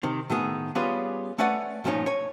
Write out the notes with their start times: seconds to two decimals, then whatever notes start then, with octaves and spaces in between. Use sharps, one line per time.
0.03 C3 D#3 C4
0.30 A2 D#3 B3 G#4
0.75 G3 B3 C#4 F4 G#4 B4
1.38 A3 C#4 B4 D5 F#5 G#5
1.84 G2 A#2 F3 A#3 C#4 D#4
2.06 C#5 G#5